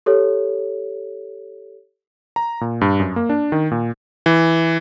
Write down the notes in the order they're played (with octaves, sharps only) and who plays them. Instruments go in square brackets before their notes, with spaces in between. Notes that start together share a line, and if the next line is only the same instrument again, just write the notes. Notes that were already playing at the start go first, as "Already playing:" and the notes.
[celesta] G4 A4 C#5
[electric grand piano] A#5
A#2
G2
F#2
A#3
D4
D#3
A#2
E3